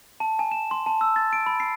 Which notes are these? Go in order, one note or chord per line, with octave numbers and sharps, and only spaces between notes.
A5
G#5
E7
C6
A5
E6
A6
D7
B5
C7